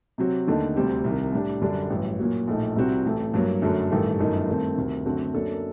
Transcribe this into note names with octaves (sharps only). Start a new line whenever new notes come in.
C3 F#3 C4 F#4
D#2 D3 A3 D#4
D2 C3 G3 C4 G4
C2 C3 D#3
A2 G3 D4 G4
F#2 D3 G3 D4 F#4
A1 G2 F#3
A#2 F#3 A#3 F#4
A#1 A2 A3 D#4
C2 C3 G3 C4 F#4
A1 A2 A3
G2 F#3 A#3
F#2 D3 F#3 A3
A1 G2 D#3 A3
G1 F#2 D#3 A3 D#4
G2 D#3 A3 C4
D2 C3 D#3
F#2 D3 A3 C4 F#4
F#2 F#3 A#3 D4 A4